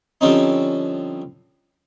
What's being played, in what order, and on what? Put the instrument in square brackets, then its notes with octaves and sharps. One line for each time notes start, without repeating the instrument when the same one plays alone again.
[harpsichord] D3 F3 G3 C4 C#4 D#4